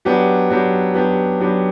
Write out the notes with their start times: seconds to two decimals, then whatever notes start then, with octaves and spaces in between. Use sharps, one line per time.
0.05 F#3 B3 D4 G4
0.50 F#3 B3 D4 G4
0.95 F#3 B3 D4 G4
1.40 F#3 B3 D4 G4